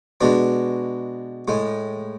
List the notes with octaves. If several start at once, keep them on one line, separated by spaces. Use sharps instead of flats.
B2 G#3 D4
A2 G#3